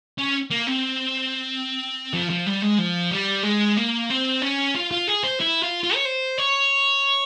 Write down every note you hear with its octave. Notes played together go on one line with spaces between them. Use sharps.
C#4
A#3
C4
F3
F3
G3
G#3
F3
G3
G#3
A#3
C4
C#4
F4
F4
G#4
C5
E4
F4
F4
C#5
C5
C#5